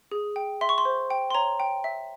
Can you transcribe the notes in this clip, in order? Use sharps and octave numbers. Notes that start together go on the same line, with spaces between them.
G#4
G5
E5 C6
C#6
C6
C5
G5
C6
C#5 A#5
G5
E5